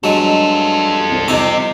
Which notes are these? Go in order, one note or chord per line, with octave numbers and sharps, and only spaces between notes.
G2 F#3 G#3 F4 A4
C2
C2 F2 C3 D#4 D6